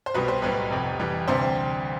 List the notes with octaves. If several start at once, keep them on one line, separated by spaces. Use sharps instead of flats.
C5
C2 B2 G3 B4
C5
B1 A2 G3 B4
F1 F2 C3
F1 F2 E3 G3
D2 C3 E3 G3 C5